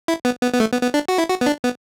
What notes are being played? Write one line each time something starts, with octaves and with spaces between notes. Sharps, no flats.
E4
B3
B3
B3
A3
B3
B3
D4
F#4
E4
F#4
B3
D4
B3